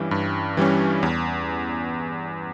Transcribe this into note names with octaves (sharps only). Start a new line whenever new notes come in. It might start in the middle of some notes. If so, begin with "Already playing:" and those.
Already playing: G2 E3 G3 C#4
G2
E3 G3 C#4
E2